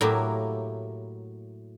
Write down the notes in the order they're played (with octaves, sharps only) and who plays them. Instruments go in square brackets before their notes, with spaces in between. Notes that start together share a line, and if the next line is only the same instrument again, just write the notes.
[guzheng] A2 F#3 A#3 E4 G4